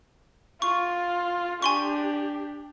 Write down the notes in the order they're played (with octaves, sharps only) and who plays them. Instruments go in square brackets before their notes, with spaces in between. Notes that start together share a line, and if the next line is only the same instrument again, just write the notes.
[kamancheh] F4 [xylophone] C#6
[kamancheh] D4 G4 [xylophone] G#5 C6 C#6